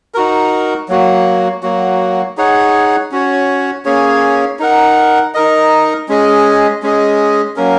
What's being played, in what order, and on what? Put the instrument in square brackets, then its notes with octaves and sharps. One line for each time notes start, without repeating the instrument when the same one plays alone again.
[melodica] D#4 F#4 A#4
F#3 A#3 F#4
F#3 A#3 F#4
D#4 G#4 C#5 F#5
C#4 F#4 C#5
A#3 C#4 G#4 C#5
D#4 A#4 F#5
D#4 A#4 D#5
G#3 C#4 G#4 D#5
G#3 C#4 G#4 D#5
F#3 A#3 C#4 A#4